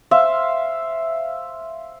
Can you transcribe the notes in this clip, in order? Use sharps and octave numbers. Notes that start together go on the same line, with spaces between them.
C5 E5 F5